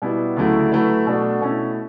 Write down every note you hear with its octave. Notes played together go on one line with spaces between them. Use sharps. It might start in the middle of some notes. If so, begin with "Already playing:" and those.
B2 G3 B3 E4
D2 C#3 F#3 A3 E4
F#3 A3 E4 B4
B2 A3 D4 F#4 A4
B2 A3 C#4 E4 A4